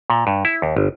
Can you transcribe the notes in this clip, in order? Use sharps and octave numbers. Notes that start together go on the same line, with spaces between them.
A#2
G2
E4
D#2
G1